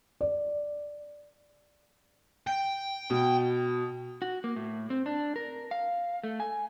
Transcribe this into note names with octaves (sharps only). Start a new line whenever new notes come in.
D5
G5
B2
F#4
A#3
A2
C4
D4
A#4
F5
A3
G#5